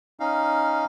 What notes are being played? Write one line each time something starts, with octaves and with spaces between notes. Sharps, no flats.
C#4 D#4 F5